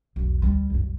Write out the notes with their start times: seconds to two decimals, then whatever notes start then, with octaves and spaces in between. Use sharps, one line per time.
0.16 B1 E2
0.42 D2 G3
0.70 C2 F#2